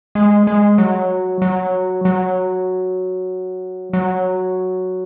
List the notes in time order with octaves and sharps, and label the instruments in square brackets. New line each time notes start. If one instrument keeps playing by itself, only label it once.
[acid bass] G#3
G#3
F#3
F#3
F#3
F#3